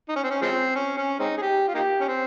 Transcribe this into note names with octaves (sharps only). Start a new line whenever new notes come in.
D#4
C#4
C4
C#4
F3 G#3 C4
C#4
C#4
G#3 C4 D#4
G#4
G4
F4
A#3 D#4 G4
C#4
C4